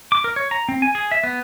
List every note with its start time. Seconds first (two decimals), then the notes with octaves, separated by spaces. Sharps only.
0.12 D6
0.24 A#4
0.36 C#5
0.51 A#5
0.69 C4
0.82 G#5
0.95 G#4
1.12 E5
1.24 B3